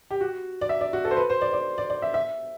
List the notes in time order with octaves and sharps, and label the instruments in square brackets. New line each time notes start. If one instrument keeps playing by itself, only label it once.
[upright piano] G4
F#4
D5
E5
D5
F#4
A4
C5
B4
C5
D5
D5
D5
D5
E5
E5